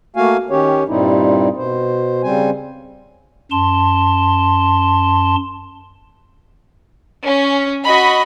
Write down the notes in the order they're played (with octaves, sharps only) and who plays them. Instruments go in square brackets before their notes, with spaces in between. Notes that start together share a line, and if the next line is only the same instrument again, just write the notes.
[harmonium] A3 A#3 F#4 F5 G#5
D#3 C#4 G4 C#5
G2 A#2 G3 C4 D#4 E4
B2 C5
C#3 G3 C4 C5 G#5
[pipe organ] F#2 A5 C6
[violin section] C#4
F#4 D#5 B5